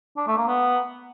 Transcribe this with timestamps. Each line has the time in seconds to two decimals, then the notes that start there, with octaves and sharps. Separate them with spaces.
0.17 D4
0.27 A3
0.37 A#3
0.47 B3